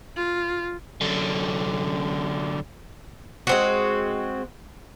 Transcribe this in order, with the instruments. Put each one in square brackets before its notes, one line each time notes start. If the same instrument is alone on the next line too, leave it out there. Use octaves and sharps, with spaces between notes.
[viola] F4
[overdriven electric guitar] F#2 D3
[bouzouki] G#3 C4 F#4